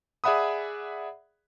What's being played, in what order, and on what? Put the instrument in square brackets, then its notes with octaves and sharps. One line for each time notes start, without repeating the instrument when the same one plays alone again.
[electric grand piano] G#4 D5 E5 F#5 B5 D#6